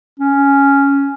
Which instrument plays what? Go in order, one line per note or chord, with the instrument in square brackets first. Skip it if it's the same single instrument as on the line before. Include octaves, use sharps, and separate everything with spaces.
[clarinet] C#4